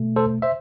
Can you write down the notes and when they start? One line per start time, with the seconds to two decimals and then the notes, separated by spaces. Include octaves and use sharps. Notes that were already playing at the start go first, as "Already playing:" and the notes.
Already playing: B2 A3
0.16 A4 C5
0.42 C5 E5